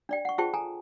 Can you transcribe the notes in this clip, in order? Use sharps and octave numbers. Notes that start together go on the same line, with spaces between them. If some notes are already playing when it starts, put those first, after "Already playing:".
D4 D5 G5
F#5 C#6
F4 G#4 C5 G5 A5 C#6
A4 G#5 A#5